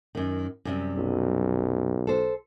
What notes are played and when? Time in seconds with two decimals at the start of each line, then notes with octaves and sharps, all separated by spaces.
0.15 F#2 D#3
0.65 F#2 C3 G3
0.97 B1
2.07 A4 C5